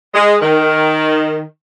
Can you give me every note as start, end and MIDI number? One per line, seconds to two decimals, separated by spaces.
0.14 0.35 56
0.42 1.41 51